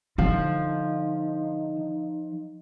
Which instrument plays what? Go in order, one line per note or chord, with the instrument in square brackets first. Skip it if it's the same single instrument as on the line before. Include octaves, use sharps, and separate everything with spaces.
[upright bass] D3 [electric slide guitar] F3 F5 [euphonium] D#4